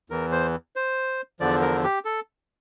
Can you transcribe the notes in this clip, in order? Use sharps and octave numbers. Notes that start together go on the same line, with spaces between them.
E2 E3 A#4
C5
C5
E2 D3 F3 D5
A#4
G4
A4